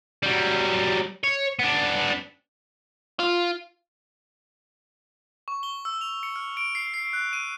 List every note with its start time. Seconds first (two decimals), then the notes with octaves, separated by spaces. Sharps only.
0.23 F#3 G3
1.24 C#5
1.59 B3 D4
3.20 F4
5.48 C#6
5.63 G7
5.85 E6
6.01 F7
6.23 C#7
6.36 F6
6.57 D7
6.75 C7
6.94 C7
7.13 F#6
7.33 D#7